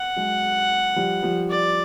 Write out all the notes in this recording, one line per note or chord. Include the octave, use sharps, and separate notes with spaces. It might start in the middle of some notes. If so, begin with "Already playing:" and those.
Already playing: F#5
F#3 G#3
F3 G3
F3 G3
D5